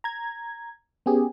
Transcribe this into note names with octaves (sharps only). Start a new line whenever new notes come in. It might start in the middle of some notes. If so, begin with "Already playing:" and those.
A#5 G#6
B3 C#4 G4 G#4